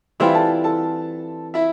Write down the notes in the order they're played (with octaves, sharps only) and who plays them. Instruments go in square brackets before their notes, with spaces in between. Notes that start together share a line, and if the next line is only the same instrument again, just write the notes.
[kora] E3 G3 C4 F4 [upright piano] E4 E5
[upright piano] A4 A5
A4 A5
E4 E5